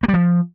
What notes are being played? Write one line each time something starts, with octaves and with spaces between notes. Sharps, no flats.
A#3
G3
F3